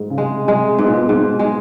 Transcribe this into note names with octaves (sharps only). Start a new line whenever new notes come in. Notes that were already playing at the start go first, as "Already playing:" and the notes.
Already playing: G#2
C#3
C3 G#3
C3 G#3
G#2 B2
A#2
B2
G#2
G#3